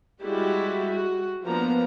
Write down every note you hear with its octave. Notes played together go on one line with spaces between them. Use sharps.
G3 G#3 E4 F#4 G4
F#4
F3 A#3 B3 D4 A#5